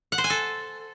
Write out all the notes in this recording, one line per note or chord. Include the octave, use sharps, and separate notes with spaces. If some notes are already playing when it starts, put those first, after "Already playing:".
F#5
C5
G#5
A4